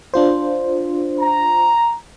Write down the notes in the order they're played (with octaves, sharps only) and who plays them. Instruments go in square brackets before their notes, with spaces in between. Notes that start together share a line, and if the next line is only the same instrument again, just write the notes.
[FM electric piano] D4 F4 C5
[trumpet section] A#5